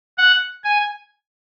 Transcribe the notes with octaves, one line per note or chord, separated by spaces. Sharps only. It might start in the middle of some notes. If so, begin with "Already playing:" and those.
F#5
G#5